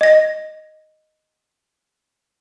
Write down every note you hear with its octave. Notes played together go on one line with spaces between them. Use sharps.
D#5 A#6